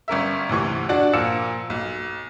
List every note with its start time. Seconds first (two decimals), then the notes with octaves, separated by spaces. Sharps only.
0.08 G1 C#4 A#4 E5
0.49 D2 C3 E3 C#6
0.89 D4 F#4 D5
1.13 A#2 F3 A#3 E6 C#7 E7
1.70 B1